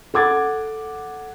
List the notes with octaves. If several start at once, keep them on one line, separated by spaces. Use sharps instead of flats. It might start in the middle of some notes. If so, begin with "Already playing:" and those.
A4 F#5 D6 G#6 A6